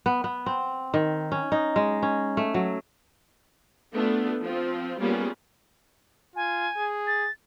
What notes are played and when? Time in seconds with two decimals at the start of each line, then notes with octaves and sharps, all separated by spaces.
0.06 B3
0.24 B3
0.46 C4
0.94 D#3
1.32 C#4
1.52 D#4
1.76 G#3
2.02 C#4
2.37 A3
2.54 F#3
3.93 A3 B3 D4 F4
4.42 F3 C4 F4
4.99 G3 A#3 B3 C#4 F4 G#4
6.36 F4 G#5
6.77 G#4
7.07 A6